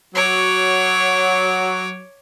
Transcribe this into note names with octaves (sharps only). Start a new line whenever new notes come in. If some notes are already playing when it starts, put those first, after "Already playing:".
F#3 C#5 D6